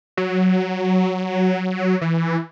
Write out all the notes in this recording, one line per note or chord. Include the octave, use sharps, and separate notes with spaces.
F#3
E3